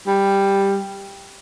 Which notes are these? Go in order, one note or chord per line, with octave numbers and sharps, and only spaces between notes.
G3